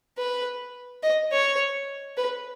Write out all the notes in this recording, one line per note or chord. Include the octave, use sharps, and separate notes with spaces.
B4
D#5
C#5
B4